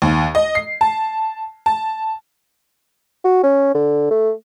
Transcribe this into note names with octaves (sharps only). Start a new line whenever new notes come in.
D#2
D#5
C7
A5
A5
F#4
C#4
D3
A3